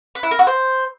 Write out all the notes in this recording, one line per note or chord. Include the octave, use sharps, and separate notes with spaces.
B4
E4
A#4
F#4
C5